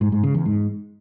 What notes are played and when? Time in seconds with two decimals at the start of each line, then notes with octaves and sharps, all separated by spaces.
0.01 G#2
0.12 G#2
0.23 C#3
0.34 E2
0.46 G#2